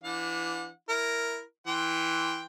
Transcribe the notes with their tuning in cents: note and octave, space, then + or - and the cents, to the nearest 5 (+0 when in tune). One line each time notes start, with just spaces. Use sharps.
E3 +20 D4 +0 F#5 -40
E4 +0 A#4 +0
E3 +0 G5 +0 C6 +0